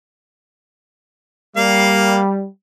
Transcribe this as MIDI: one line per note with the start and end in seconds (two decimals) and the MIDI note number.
1.57 2.47 55
1.57 2.19 58
1.57 2.19 77